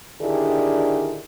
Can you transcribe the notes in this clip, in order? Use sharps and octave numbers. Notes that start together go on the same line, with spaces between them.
D3 D#3 D4 E4 G4 G#4